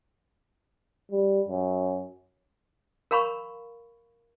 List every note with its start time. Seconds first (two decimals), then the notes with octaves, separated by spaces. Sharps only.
1.11 G3
1.49 F#2
3.11 A#4 F5 A#5 B5 C#6